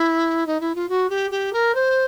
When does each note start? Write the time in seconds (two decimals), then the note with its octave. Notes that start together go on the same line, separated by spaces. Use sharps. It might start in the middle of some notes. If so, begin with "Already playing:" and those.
Already playing: E4
0.46 D#4
0.60 E4
0.75 F4
0.88 F#4
1.09 G4
1.30 G4
1.52 A#4
1.74 C5